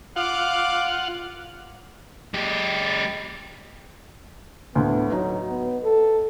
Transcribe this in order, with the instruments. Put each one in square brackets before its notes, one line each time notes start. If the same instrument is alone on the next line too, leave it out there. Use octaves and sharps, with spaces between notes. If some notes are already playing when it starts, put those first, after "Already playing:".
[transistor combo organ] F4 F#5 [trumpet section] F5 D6
[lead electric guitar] G#3 G4
[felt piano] D2 A2 [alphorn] B3
[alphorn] F#3 [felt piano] D#4
[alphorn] B3
A4